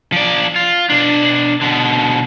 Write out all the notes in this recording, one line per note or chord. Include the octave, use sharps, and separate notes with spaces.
F3 D5
F4
B2 D4
B2 D3